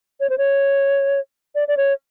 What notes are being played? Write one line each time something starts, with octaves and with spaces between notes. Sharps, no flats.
C#5
C5
C#5
D5
D5
C#5